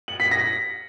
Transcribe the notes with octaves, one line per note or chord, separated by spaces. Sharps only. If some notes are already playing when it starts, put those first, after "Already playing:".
F#7
B6
A#6